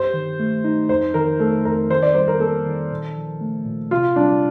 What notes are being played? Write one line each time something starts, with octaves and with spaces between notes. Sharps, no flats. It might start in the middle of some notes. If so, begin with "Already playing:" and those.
Already playing: G2 G4 C5
D#3
A3
D#4
F2 C5
D#3 A#4
A3 A4
F2 A#4
D#3 C5
D5
G3 C5
A#4
A#3 A4
D#3
A#2
F3
A3
A#2
C3 F4
G3 D4